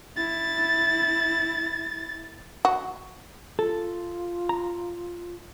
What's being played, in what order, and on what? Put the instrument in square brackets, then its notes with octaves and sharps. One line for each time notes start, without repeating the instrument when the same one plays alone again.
[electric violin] E4 A6
[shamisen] F#4
[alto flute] F4 [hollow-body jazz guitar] A4
[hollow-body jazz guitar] A#5